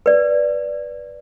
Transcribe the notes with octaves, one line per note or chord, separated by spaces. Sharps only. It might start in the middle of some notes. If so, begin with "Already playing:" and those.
B4 D5